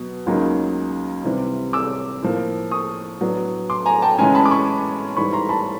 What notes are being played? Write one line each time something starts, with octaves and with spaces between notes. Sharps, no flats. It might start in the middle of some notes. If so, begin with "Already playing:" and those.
Already playing: B2 F#3 B3
C#2 C#3 F#3 A#3 D#4
C3 E3 G3 C4
D6 E6
A2 F3 A#3
C#6 D#6
A2 F#3 B3 D4
C6 D6
G#5 A#5
G5 A5
C#3 E3 G#3 C#4 G#5 A#5
A5 B5
D6
B5 C#6
G#2 E3 G3 B5 C#6
A#5 C6
A5 B5